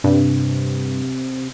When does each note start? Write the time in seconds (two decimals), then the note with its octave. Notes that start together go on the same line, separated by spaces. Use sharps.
0.04 G2 C3